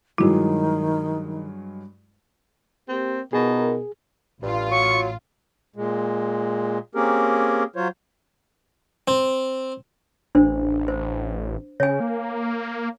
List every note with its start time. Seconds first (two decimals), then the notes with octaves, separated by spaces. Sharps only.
0.18 G2 D#3 F#3 G#3 E4 F#4
2.88 A#3 C4 G4
3.33 B2 D#4 F4 G#4 A#4
4.42 A1 G2 F4
4.71 F#3 C#6
5.76 A#2 G#3
6.95 A#3 C4 C#4 G4 G#4 A#4
7.76 F#3 F4 C5 C#5
9.08 C4
10.35 A1 D4 C5
10.88 C5
11.80 C#3 C#5 G#5
12.00 A#3